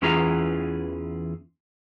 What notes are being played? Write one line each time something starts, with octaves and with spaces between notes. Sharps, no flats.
E2 E3 C#4 F4 G#4 A#5